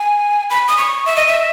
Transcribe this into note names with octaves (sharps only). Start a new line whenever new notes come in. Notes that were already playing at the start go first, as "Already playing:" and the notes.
Already playing: G#5
B5
D#6
C#6
E5
D#5
E5